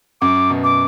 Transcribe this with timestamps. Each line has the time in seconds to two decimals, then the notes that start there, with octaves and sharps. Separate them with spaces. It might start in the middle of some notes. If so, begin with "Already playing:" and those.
0.21 F#2 D6
0.50 B2
0.64 D6